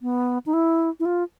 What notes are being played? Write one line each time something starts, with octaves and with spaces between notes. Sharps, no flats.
B3
D#4
E4
E4
F4